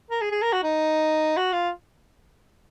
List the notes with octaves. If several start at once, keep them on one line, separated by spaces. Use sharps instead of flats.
A#4
G#4
G#4
A#4
F#4
D#4
F#4
F4